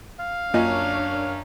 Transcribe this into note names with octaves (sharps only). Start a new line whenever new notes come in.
F5
F#2 A#3 D4 F4 A#4 C#5 D#5 G#5